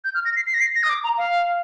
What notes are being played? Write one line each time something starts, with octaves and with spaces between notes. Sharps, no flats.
G6
F6
A#6
C7
C7
A#6
C7
A#6
D#6
D6
A#5
F5